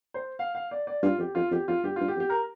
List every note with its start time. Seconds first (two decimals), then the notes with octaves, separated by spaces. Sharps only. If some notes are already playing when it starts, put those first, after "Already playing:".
0.14 C5
0.39 F5
0.55 F5
0.71 D5
0.87 D5
1.03 G2 F4
1.19 F2 G4
1.35 F2 F4
1.51 F2 G4
1.68 F2 F4
1.84 G2 G4
1.96 F4
2.00 G2
2.08 G4
2.16 F2
2.20 G4
2.30 A#4